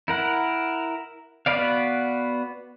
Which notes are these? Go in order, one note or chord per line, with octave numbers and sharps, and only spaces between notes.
E4 A#4 F#5
B3 F#4 B4 D5 F5